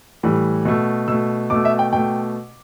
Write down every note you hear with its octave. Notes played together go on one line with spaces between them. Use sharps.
A2 E3 G3
B2 A3
B2 A3 E6
B2 A3 D6
E5
G5
B2 A3 G5